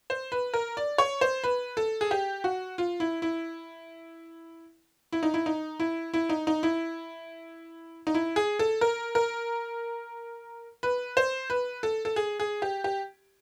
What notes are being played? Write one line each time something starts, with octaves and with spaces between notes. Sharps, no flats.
C5
B4
A#4
D5
C#5
C5
B4
A4
G#4
G4
F#4
F4
E4
E4
E4
D#4
E4
D#4
E4
E4
D#4
D#4
E4
D#4
E4
G#4
A4
A#4
A#4
B4
C5
B4
A4
A4
G#4
G#4
G4
G4